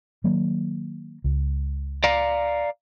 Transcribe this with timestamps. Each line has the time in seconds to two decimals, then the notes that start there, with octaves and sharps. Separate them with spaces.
0.24 D#3 F#3 A#3
1.24 C#2
2.04 D5 F5 A#5